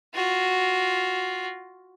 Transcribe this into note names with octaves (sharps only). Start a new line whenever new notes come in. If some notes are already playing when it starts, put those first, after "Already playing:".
F4 F#4